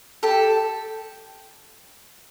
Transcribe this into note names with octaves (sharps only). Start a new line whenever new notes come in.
G4 A4